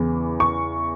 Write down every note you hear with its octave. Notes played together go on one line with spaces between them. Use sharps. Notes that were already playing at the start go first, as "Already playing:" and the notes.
Already playing: E2 C#3 E3
C#6